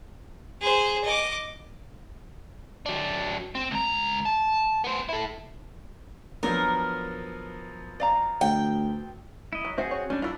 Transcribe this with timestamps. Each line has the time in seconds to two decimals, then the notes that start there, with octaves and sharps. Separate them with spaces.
0.61 G#4 C5
1.04 D#5 D6
2.86 F#3 D4
3.55 C4
3.71 C#2 A#5
4.25 A5
4.84 B3 C5
5.09 E4 A4
6.43 F3 F#3 B3 D4 A#4
8.00 D5 F5 A#5
8.41 D2 G5
9.53 E4 D#5
9.65 F#3
9.78 C4 F#4 G#4 C5 E5
9.91 C#5
10.10 G3 C#4 D4
10.22 F#3 D4 E4 F4